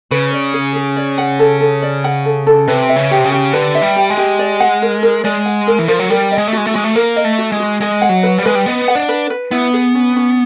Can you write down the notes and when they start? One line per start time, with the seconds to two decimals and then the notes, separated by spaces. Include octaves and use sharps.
0.11 C#3 B4
0.33 D5
0.54 G#4
0.76 G#4
0.96 D5
1.18 F#5
1.39 A4
1.60 A4
1.82 D5
2.04 F#5
2.25 A4
2.47 A4
2.68 C3 B4
2.89 E5
2.96 C#3
3.11 G4
3.18 C3
3.24 C#3
3.32 G4
3.53 D3 B4
3.75 E5
3.82 G3
3.96 G4
4.10 G#3
4.17 G4
4.39 D5
4.60 F#5
4.82 A#4
5.03 A#4
5.24 G#3 D5
5.46 F#5
5.67 A#4
5.79 E3
5.88 F3 A#4
5.99 F#3
6.10 G3 A#4
6.31 D#5
6.38 G#3
6.48 A3
6.53 G#3 F#4
6.67 A3
6.73 G#3 F#4
6.84 A3
6.95 A#3 A#4
7.16 D#5
7.24 A3
7.38 F#4
7.52 G#3
7.60 F#4
7.80 G#3 D#5
8.02 F#5
8.09 F#3
8.23 B4
8.38 G3
8.46 G#3 B4
8.55 G3
8.66 B3 D#5
8.88 F#5
8.95 D4
9.09 B4
9.30 B4
9.51 B3 E4
9.74 G#4
9.95 C#4
10.16 C#4